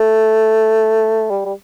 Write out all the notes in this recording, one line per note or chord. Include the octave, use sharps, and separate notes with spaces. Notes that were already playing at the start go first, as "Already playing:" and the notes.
Already playing: A3
G3
G3